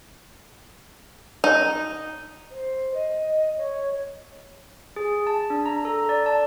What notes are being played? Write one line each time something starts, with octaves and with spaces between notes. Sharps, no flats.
D#4
C5
D#5
C#5
G#4
A5
D4
A#5
A4
D5
A5